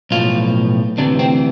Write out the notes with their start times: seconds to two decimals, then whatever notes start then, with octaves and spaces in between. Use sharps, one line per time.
0.11 B1 A2 F3 F4
0.98 D2 C3 E3 D4
1.19 C4